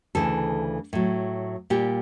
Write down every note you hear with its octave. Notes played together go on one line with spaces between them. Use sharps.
D2 C#3 E3 A4
A2 F#3
A#2 G3 G4